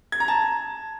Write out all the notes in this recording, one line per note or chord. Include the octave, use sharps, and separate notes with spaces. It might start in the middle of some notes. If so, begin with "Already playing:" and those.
G#6
A#5
A5